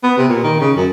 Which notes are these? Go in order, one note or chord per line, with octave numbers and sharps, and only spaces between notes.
B3
C3
A#2
D#3
C#3
F#2